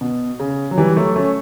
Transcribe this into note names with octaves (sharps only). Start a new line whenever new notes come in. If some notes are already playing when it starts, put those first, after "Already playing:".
B2
C#3
F#3
E3 G3
F#3 A3
A3 C#4